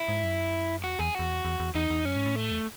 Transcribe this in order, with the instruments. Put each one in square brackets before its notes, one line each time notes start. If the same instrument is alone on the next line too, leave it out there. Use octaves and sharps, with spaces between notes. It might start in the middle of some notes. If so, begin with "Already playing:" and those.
Already playing: [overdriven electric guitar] E4
[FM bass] G#2
F#2
[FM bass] E2 [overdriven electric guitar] F#4
[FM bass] E2 [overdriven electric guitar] G#4
[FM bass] E2 [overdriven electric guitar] F#4
[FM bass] E2
E2
[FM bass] E2 [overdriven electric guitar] D#4
[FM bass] E2
[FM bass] F#2 [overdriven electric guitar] C#4
[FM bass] G#2
A2
[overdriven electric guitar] A3
[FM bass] E2